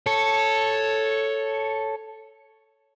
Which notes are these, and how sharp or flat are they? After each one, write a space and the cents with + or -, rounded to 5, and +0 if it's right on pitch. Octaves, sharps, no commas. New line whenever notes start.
A4 +0 C#5 +0